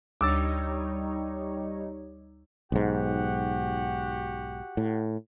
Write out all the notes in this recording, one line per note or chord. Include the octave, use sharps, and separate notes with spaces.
D2 G3 D#4 C#5 D6 E6 A6
B1 G#2 F#4 G4 F#5
A2